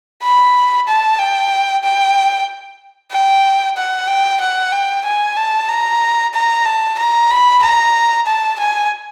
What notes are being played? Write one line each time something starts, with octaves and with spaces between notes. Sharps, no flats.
B5
A5
G5
G5
G5
F#5
G5
F#5
G5
G#5
A5
A#5
A#5
A5
A#5
B5
A#5
A5
G#5